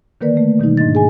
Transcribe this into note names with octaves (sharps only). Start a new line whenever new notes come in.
D3 D#3 A#3 A#4 B4 D5
A3
B2 D#3 G3 D#4
G#2 D4 D#5 A6
G#4 G#5